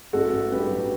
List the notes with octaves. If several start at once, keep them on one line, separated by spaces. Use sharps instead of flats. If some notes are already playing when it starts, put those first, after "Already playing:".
A1 F#4 A4
A1
G2 G4 B4
F#3